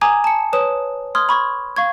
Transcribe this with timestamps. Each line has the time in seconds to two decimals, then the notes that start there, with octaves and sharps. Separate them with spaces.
0.01 G#5 A#5 D6 D#6 G#6
0.24 A5 C#7
0.53 B4 C#5 D#6 E7
1.15 C6 D#6 F6 G#6
1.29 B5 C#6 G#6
1.76 F5 C#6 G#6